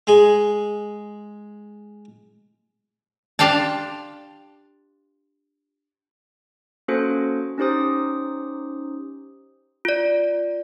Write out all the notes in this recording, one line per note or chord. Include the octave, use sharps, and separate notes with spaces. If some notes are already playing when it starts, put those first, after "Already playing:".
G#3 G#4
D4 F4 G4 F5 G5 A5
A#3 C#4 F#4 A4 C5 C#7
C#4 D#4 G4 C5 D#6
F4 D5